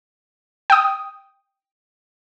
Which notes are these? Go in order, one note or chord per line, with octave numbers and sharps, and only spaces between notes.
G5 D#6